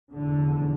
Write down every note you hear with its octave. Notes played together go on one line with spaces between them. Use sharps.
F1 E2 B2 D3